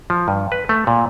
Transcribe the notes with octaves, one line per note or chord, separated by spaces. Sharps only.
F3
G2
B4
A3
A#2